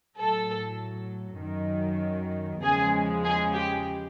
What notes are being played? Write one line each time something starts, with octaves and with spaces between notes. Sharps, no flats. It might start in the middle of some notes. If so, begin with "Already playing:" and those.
A2 F#3 A4
F#2 D#3 F#3
E2 C#3 F3 G#3 G#4
G#4
G4